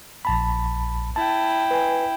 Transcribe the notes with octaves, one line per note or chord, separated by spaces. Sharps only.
A#1 A5 B5
E4 G5 A5
B4 G#5